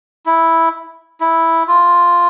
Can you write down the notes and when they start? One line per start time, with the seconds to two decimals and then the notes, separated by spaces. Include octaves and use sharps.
0.26 E4
1.21 E4
1.68 F4